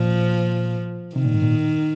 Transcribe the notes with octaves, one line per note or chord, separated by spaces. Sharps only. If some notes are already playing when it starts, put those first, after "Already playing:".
Already playing: A#2 F3
C3 D#3
A#2
G#2
A#2